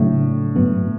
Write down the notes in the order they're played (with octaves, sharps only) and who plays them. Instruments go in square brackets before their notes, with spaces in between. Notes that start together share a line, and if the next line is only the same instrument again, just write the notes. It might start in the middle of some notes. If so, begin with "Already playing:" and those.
Already playing: [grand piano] A2 [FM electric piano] C#3 F#3 A3 D4
[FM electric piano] G2 F#3 B3